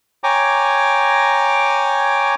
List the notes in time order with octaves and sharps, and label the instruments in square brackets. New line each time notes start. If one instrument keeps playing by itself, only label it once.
[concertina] C#5 G5 G#5 A#5 D6